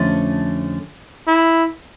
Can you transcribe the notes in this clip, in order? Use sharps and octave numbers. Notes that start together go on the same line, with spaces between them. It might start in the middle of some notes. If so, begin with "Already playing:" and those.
Already playing: F2 D3 F3 A3 C#4
E4